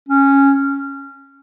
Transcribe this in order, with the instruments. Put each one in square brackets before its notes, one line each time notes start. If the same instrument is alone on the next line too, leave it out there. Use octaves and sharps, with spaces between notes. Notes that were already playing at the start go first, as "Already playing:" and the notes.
[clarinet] C#4